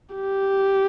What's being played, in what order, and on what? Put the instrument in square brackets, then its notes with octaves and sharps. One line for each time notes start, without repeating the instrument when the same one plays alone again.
[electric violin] G4